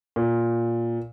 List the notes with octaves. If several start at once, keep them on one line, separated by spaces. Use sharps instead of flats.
A#2